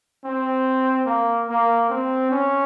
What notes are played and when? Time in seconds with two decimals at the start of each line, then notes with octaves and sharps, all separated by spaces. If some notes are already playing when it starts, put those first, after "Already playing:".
0.25 C4
1.06 A#3
1.48 A#3
1.90 C4
2.31 C#4